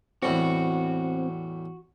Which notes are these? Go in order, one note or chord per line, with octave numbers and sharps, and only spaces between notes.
E2 A2 G3 C4 F#4